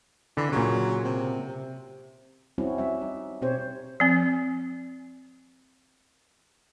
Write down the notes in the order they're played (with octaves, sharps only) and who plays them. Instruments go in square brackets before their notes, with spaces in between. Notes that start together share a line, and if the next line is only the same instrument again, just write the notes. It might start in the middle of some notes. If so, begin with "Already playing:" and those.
[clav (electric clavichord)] D3 [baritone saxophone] E3
[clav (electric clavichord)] A#2 C#3 [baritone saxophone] F#3
[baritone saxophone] C3
C3
[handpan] G3 C4 C#4 E4 F#4
G3 E5
D#4
B2 C4 G4 C5 C#5
[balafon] F3 C4